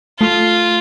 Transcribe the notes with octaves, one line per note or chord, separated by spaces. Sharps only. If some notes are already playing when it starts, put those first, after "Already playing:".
A3 F4